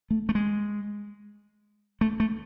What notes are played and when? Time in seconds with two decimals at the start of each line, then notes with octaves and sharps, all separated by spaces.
0.10 A3
0.29 A3
0.35 G#3
2.01 A3
2.20 A3